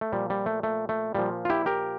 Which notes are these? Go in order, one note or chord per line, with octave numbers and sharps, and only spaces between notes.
A3
A#2 F3 G3
G3
A3
A3
A3
A#2 F3 G3
F4
E4 G4
G4 A#4